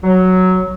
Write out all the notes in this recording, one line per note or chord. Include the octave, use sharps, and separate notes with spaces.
F#3